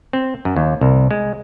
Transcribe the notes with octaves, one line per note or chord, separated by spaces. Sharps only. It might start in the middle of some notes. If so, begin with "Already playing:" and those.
C4
F#2
D#2
C2
G#3